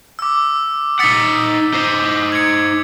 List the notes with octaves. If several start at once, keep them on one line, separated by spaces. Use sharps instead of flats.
D6 E6
D#4 F#5 D#6 A6 B6
D#4 C5
G#6 C#7